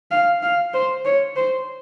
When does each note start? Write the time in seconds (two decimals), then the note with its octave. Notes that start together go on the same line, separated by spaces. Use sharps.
0.11 F5
0.43 F5
0.74 C5
1.05 C#5
1.36 C5